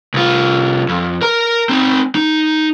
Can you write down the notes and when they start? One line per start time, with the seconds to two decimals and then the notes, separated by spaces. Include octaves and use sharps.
0.14 C2 F4
0.89 F2
1.22 A#4 A#5
1.69 C4 D#4
2.15 D#4